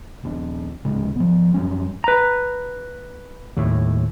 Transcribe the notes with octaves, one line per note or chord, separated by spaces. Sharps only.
D#1 G#2 D4
D1 C#3 G#3
F3 B3
F#2 G3 C#4
B4 A#5
D#2 A2